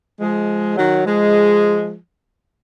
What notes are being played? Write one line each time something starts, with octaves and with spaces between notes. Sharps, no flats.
F3 G#3
D#3 F#3
F3 G#3